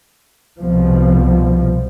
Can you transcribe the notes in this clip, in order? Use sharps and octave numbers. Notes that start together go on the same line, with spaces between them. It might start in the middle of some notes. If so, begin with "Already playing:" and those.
C2 B2 F3